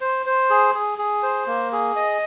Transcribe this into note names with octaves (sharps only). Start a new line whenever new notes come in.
C5
C5
G#4
G#4
G#4
C5
A#3
G#4
D#5